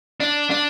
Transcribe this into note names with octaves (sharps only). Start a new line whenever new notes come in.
D4
D4